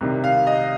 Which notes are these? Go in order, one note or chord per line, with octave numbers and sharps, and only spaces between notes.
C2 C3 D#3
F5
D#5